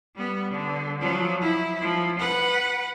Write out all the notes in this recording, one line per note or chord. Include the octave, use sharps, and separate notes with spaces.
G3 B3
D3
F3 F#3
E4
F3
B4 F#5